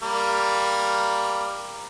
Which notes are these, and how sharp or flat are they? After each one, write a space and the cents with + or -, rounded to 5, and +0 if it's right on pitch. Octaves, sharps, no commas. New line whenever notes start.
G3 +10 A#3 +0